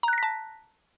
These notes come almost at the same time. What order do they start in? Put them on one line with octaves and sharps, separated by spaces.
A#5 F#6 A#6 B6 A5